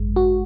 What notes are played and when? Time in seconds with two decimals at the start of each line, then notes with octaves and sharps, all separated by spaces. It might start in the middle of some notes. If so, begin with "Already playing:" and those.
Already playing: G#1 F#2 G#3
0.16 F#4